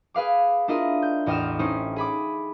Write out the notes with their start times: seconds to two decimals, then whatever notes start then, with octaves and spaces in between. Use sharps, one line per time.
0.14 G#4 B4 F5 D6
0.68 D4 E4 F4 A#4 D#5
1.02 G6
1.26 A1 E2 D#5 G5 F6 E7
1.59 C#4 D#4 E4 C5
1.96 G#4 B5 D6